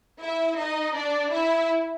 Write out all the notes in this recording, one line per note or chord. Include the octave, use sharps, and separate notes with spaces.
E4 E5
D#4 D#5
D4 D5
E4 E5